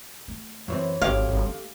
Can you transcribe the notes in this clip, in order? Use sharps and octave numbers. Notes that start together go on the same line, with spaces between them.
A3
F#2 E3 C4 C#5
D#1 G#1 A3 G4 F5
G1
D4